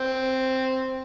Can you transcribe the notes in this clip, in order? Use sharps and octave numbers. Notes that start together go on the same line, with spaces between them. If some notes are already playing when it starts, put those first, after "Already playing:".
Already playing: C4